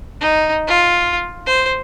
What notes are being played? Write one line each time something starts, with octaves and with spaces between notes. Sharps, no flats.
D#4
F4
C5